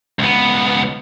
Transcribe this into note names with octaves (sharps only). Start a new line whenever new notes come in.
C#2 B3